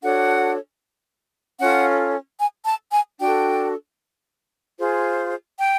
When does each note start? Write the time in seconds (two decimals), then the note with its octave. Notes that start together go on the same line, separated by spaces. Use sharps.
0.02 D4 F#4 A4 C#5 F#5
1.61 C#4 F4 A4 F#5
2.40 G#5
2.66 A5
2.92 G#5
3.19 D4 F#4 A4 G5
4.78 F4 G#4 C5
5.58 G5